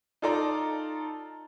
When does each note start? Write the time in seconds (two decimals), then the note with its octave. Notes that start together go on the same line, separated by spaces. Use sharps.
0.22 D#4 F4 A4 D5 A#5